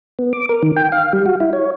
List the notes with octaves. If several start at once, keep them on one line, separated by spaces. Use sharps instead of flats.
B3
D6
A#4
D#3
G5
F5
G3
F#4
E4
C#5